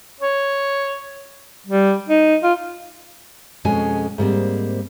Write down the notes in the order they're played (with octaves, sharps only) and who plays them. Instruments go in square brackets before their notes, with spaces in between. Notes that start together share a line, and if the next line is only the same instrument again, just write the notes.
[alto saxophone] C#5
G3
D#4
F4
[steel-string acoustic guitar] F2 B2 G#3 C#4 G#5
G#2 G3 A#3 C4